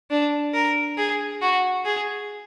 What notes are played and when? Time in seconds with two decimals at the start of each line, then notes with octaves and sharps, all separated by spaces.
0.10 D4
0.54 A#4
0.97 G#4
1.42 F#4
1.85 G#4